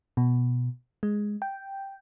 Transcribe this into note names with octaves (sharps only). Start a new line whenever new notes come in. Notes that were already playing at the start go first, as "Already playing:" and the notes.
B2
G#3
G5